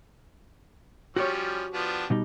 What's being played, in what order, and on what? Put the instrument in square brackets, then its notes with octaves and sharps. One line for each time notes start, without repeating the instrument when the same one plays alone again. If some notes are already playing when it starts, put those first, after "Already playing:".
[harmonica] F3 G3 C#4 [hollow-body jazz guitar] F#4 G4 C#5
[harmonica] F3 B3 D4
[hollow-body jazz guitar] B2 G3 D#4